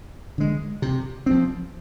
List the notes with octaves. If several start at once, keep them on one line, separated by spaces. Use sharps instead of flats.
D3 G#3
C3
F3 C4